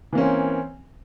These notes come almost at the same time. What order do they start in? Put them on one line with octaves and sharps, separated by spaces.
E3 A#3 C#4 C4